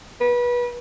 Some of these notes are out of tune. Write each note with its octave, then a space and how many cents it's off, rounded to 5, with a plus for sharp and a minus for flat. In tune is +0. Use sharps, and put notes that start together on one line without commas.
B4 -25